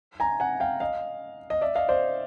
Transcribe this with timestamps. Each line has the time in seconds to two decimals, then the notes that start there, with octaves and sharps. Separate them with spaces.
0.20 G#5 A#5
0.40 F#5 G#5
0.60 F5 G5
0.80 D#5 F5
1.50 D#5
1.61 D5 E5
1.75 D#5 F5
1.88 C5 D5